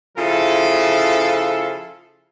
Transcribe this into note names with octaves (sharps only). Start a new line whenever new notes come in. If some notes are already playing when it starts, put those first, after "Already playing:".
C#3 F3 E4 F4 A4